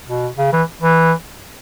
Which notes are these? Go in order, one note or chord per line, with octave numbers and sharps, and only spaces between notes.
B2
C#3
E3
E3